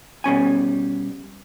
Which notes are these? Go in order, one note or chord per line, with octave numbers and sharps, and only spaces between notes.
B2 G3 C#4 G#5